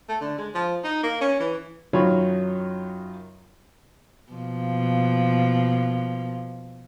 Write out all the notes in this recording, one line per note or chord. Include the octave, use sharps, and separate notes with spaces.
A3
D3
G#3
F3
D#4
A#3
C#4
E3
F#2 D#3 F#3 F4 C#5 B5
B2 F3 A#3